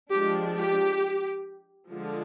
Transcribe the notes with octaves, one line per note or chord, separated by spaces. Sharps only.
F3 G#3 D4 G4
G4
D3 F3 G#3